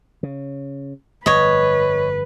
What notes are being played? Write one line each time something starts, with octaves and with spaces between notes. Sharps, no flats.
C#3
G1 F2 B4 C#5 D#5